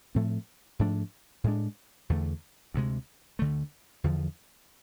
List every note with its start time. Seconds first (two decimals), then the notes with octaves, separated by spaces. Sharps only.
0.15 A2 F3 A3 C4
0.79 G#2 F3 A3 D4
1.44 A2 G#3 D4
2.10 E2 D3 A3
2.74 D2 C3 G#3
3.39 D2 D3 A3
4.04 E2 D3 F3